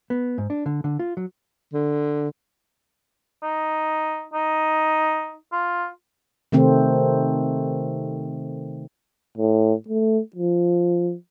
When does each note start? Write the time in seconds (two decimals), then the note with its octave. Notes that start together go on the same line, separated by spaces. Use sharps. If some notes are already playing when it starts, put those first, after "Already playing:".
0.10 B3
0.38 G#2
0.50 D4
0.66 D3
0.84 D3
0.99 F4
1.17 F#3
1.73 D3
3.43 D#4
4.34 D#4
5.52 F4
6.52 C3 D#3 A3 C4
9.38 A2
9.88 A3
10.36 F3